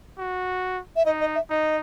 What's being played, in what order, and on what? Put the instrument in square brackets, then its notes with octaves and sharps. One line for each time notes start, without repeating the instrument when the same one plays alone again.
[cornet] F#4
[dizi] E5
[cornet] D#4 [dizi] D#5
[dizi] D#5
E5
[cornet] D#4 [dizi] D#5